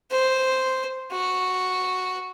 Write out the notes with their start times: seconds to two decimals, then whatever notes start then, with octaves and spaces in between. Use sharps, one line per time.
0.11 C5
1.12 F#4